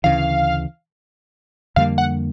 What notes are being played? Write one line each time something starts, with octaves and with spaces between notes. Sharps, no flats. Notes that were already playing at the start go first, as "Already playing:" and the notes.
D2 C#3 E3 F5
F2 D3 G3 A#3 F5
F#5